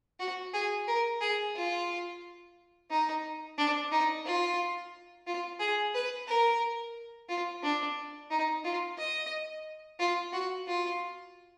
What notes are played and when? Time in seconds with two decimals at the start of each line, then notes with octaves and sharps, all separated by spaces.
0.20 F#4
0.54 G#4
0.88 A#4
1.21 G#4
1.56 F4
2.91 D#4
3.58 D4
3.92 D#4
4.26 F4
5.27 F4
5.60 G#4
5.95 B4
6.28 A#4
7.29 F4
7.63 D4
8.31 D#4
8.65 F4
8.98 D#5
10.00 F4
10.33 F#4
10.68 F4